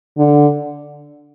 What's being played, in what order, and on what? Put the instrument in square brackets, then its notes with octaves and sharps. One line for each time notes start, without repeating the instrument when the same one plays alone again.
[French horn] D3